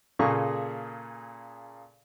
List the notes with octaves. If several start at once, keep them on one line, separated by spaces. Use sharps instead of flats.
A#2 C#3 A#3 G#4 A4 C#6